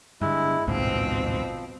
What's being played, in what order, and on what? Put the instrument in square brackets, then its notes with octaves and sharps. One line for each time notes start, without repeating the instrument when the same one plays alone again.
[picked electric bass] G2 D3 [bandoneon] G#3 E4
[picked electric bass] A1 D2 G#2 [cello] B2 C4 [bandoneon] F3